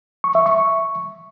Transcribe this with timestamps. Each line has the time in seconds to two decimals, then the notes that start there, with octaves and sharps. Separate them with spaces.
0.24 C#6
0.35 E5
0.46 C#6